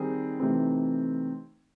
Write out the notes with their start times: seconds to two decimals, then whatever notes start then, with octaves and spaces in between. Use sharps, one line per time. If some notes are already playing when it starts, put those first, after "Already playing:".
Already playing: D#3 G3 C4 D#4 G#4
0.39 C3 E3 A3 C4 D#4